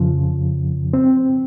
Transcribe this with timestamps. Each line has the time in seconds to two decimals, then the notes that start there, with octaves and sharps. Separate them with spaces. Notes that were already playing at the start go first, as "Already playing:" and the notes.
Already playing: F2 C#3 F3
0.93 C4